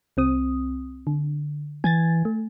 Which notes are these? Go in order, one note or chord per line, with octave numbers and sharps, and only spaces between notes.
C2 C4 D#6
D3
E3 G#5 G#6 A6
A3